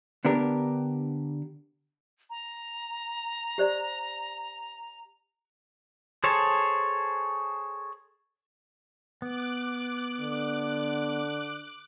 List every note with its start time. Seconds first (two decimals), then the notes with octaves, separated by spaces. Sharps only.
0.25 D3 B3 D4 G4 A#4
2.30 A#5
3.58 G4 C5 D5
6.24 G#4 A4 C5 C#5 A5
9.22 B3 D6 F#6
10.20 D3